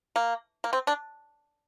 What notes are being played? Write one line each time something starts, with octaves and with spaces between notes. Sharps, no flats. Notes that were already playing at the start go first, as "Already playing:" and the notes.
A#3
A#3
C4
D4